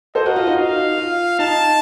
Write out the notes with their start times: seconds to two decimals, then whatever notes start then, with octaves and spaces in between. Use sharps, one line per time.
0.15 A4 C5 D#5
0.26 F#4 A#4
0.36 F4
0.47 D#4 F#4
0.57 F5
0.98 F4
1.39 D#4 A5